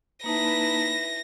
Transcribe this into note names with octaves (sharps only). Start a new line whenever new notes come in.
A#3 D#4 E4 B4 A5 A#6